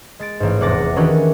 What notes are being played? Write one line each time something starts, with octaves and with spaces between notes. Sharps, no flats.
G#3 A6 D7
A1 G#2
F1 E2 F#5 D6 A6 A#6
D#3 E3 C#4 D4 F#4 G4